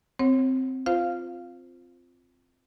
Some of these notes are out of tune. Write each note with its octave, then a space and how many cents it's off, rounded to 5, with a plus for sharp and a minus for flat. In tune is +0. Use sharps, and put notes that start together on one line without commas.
C4 -5 C#5 -35 F#5 +0
F4 +0 C5 +0 F5 +0